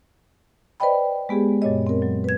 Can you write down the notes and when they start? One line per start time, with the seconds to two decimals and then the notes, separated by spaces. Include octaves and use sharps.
0.80 B4 C5 D5 D#5 G5 B5
1.29 G#3 B3 G4 G#4
1.62 F#2 A#2 C#5 D#5
1.87 C4 A#4
2.02 F#3
2.24 B4 G#6